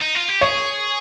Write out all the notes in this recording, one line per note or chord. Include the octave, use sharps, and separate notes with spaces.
D#4
F4
G4
G#4 C#5